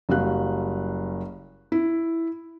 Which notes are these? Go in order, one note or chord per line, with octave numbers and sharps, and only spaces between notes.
F#1 F#3 G3 F5 F#6
E4